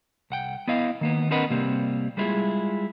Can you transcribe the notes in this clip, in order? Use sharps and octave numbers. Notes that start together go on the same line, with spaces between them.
C2 F#5 G5
B3 E4 D#5 F5
D#3 A#3 B3
C4 D4 A#4 B4 D#5 F#5
C3 G3 A#3 C4
G3 G#3 B3 E4 F4 G#4